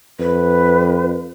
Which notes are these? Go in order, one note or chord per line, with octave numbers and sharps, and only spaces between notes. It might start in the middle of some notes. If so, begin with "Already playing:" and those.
F2 B4